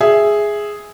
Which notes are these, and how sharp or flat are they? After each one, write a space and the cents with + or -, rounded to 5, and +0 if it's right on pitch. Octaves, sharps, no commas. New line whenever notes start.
G#4 +0 E5 +0